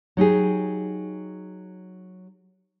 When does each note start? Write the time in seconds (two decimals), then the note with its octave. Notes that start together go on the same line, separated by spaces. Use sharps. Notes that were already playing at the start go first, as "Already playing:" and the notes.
0.17 F#3 D#4 G4 G#4